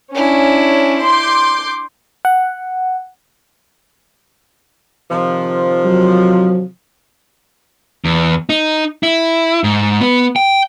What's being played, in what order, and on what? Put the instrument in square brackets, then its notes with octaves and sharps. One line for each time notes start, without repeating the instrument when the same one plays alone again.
[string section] C#4 [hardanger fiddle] D4 E4
[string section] C6 D6 G6
[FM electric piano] F#5
[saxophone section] C3 D#3 F3
[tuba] F#3
[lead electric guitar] E2
D#4
E4
G#2
B3
G5